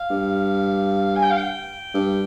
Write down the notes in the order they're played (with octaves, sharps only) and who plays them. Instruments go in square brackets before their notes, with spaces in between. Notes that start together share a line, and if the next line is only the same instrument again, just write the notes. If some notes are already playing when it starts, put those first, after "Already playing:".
Already playing: [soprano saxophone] F5
[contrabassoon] G2
[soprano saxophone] G#5
G5
F5
G5
[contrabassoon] G2